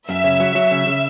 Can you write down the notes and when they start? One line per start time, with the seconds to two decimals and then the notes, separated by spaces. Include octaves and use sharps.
0.09 F#2 E5
0.24 C#3
0.40 F#3
0.55 F#3
0.71 C#3
0.87 C#3